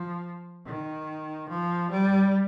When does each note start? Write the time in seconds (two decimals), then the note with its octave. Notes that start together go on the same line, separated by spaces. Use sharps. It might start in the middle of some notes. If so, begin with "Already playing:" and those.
Already playing: F3
0.66 D#3
1.49 F3
1.90 G3